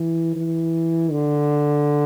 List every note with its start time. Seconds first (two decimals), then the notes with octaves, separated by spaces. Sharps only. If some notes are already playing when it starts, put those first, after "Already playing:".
Already playing: E3
0.36 E3
1.11 D3